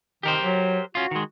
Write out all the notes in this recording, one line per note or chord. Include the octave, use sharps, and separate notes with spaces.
D#3 G4 A#4 C5
F#3
C#4 F4 F#4
D#3 G#3